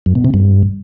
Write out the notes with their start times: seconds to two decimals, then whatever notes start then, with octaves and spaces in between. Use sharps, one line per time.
0.06 F#2
0.15 B2
0.25 C3
0.34 G2